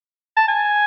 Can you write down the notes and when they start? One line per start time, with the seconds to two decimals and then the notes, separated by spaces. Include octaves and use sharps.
0.37 A5
0.48 G#5